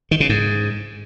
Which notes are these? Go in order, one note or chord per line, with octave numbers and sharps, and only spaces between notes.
D#3
C#3
G#2